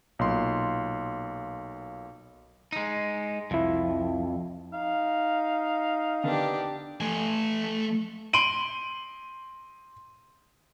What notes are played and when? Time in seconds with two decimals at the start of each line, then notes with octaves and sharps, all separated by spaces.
0.19 B1 A#2 C6
2.72 G#3 D#4
3.51 C2 F2 E4
4.74 D#4 F5
6.24 D3 D#3 B3 D4 G4
7.01 A3 G#5
8.33 C6 D7 D#7 F#7